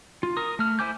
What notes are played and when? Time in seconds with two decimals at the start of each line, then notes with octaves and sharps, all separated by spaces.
0.23 F4
0.37 A#4 D#6
0.59 A3 F6
0.79 E4 C5 G#5 D6 G6